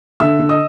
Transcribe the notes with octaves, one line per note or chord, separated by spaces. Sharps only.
D3 E5 E6
D3
D#5 D#6